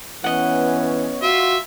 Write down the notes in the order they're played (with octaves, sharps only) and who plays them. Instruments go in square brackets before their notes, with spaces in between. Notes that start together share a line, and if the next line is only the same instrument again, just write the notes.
[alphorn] E3 [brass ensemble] B3 C#4 C#5 [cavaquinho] D#5 F#5
[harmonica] F4 E5 [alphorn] F#4